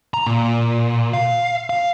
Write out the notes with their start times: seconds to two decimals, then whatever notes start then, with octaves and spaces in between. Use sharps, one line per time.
0.14 A#5
0.26 A#2
1.13 F5
1.70 F5